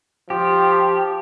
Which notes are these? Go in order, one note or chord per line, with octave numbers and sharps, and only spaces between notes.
F3 G4